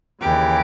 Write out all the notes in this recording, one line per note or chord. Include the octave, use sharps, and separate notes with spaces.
D#2 C#3 E3 G4